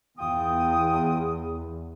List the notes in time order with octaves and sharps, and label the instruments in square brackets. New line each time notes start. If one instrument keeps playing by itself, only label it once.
[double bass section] E2 [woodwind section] F4 G5 D#6